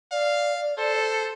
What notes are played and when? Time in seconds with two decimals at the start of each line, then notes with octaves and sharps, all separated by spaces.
0.12 D5 F5
0.78 A4 C5